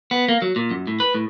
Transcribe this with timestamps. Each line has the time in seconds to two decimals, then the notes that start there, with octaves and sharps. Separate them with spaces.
0.11 B3
0.28 A#3
0.42 F#3
0.56 A#2
0.71 F#2
0.87 A2
1.00 B4
1.14 A2